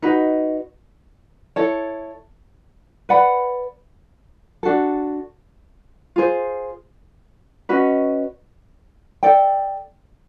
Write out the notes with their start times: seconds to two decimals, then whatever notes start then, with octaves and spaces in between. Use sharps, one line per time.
0.02 D#4 F#4 B4 D#5
1.56 E4 A4 C#5
3.09 B4 D5 F#5 B5
4.63 D4 F#4 A4
6.16 F4 G#4 C5
7.69 C#4 F#4 B4 D#5
9.23 A4 D5 G5